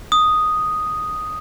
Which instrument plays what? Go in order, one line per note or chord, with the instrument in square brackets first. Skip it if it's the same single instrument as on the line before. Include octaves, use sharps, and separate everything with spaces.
[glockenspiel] D#6